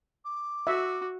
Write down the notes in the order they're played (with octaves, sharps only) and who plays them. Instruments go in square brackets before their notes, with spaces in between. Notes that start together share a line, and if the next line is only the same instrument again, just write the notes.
[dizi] D6
[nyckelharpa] F#4 [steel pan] E5